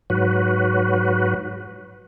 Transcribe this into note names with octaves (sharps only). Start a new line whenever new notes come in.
G#2 F#3 F#4 B4